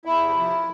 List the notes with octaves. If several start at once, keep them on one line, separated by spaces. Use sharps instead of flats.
E2 E4
C3
F3